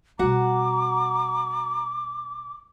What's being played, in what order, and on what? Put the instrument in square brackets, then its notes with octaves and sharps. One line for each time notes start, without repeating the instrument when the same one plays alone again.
[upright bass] B2 G3 [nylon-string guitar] F#4 F#5 [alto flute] A#5 [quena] D6